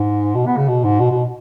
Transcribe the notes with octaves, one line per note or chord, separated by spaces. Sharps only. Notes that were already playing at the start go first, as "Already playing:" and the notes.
Already playing: G#2
B2
B3
C#3
B2
G#2
B2
B2